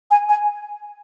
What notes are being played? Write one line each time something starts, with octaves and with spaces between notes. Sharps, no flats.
G#5
G#5